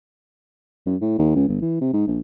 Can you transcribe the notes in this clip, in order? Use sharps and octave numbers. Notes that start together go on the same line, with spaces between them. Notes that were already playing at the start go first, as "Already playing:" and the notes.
F#2
A2
D#2
C#2
G1
E3
C3
G#2
A#1